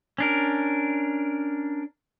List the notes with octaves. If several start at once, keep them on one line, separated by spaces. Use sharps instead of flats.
C#4 D4 A#4